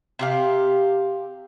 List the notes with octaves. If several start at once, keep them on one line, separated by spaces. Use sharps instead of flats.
C3 G4 F5